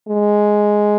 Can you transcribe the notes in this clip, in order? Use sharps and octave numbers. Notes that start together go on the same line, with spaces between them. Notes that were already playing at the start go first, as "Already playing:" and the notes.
G#3